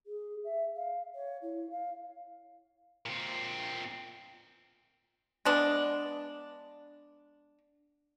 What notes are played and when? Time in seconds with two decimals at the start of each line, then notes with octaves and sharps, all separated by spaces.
0.06 G#4
0.44 E5
0.76 F5
1.15 C#5
1.42 E4
1.70 F5
3.06 A#2 C4
5.45 G#3 B3 D4